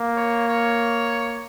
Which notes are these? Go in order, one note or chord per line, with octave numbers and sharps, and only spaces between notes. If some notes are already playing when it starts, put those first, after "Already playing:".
Already playing: A#3
C#5
C#5